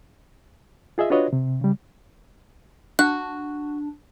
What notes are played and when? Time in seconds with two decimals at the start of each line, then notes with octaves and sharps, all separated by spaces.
0.98 F4 G#4 D#5 E5
1.10 D4 F4 F#4 B4 C#5 D#5
1.33 C3
1.61 C#3 G3
2.99 D4 F#4 F#6